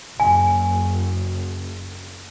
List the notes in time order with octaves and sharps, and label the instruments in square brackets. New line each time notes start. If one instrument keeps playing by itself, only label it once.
[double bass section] F#1 [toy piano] G#5